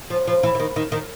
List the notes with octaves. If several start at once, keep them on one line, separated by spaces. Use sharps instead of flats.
F3
F3
E3
E3
D#3
D#3
D#3